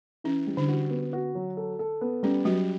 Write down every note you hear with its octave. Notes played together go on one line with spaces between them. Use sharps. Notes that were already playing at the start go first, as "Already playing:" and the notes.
E3 C#4
G3
D3 D4
F#4
B3
F#4
F#3
A4
A4
B3
G3 C#4
F#3 G3 F#4